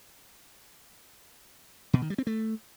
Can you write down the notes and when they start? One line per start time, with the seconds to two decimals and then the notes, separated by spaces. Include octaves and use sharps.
1.93 B2
2.02 D#3
2.10 G3
2.18 C4
2.27 A3